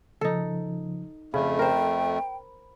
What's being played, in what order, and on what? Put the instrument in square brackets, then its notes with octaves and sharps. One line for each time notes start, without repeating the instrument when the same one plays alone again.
[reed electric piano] C#3 F3 [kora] D#4 A4
[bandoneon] F2 A3 [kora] C#3 [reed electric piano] B5
[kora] A#4 C5 [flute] G5